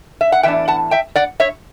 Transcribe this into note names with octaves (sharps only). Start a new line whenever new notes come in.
E5
F#5
A2 E3 B3 D4 E5 G5
F#5 A5
E5 G5
D5 F#5
C#5 E5